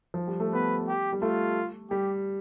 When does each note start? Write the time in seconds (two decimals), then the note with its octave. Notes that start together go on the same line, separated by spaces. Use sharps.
0.14 F3
0.28 G3
0.40 A3
0.53 B3 B4
0.87 G4
1.13 G3
1.22 A3 F4
1.90 G3 G4